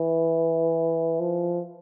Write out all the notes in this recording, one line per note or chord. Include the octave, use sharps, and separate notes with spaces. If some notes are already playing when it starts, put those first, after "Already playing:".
Already playing: E3
F3